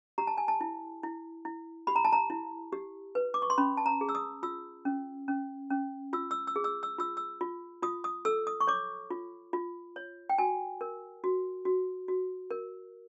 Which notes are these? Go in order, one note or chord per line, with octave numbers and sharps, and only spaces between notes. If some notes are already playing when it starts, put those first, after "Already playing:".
G4 A#5
A5
G#5
A5
E4
E4
E4
G4 B5
A#5
A5
A#5
E4
G4
B4
D6
C#6
C6
C#4 B5
A5
A#5
G#4
E6
D#6
F4 E6
C#4
C#4
C#4
F4 E6
E6
E6
G#4
E6
E6
F4 E6
E6
F4
F4 D#6
D#6
A4 E6
D#6
C#6
C#5 D6
F4
F4
C#5
G5
F#4 G#5
A#4
F#4
F#4
F#4
A#4